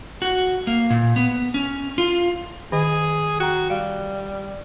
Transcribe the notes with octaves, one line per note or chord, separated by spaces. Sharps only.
F#4
A#3
A#2
B3
C#4
F4
D#3 G#4 D#5
F#4 G5 A#5
G3 F5